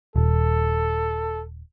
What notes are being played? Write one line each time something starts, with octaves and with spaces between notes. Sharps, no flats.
D#1 A4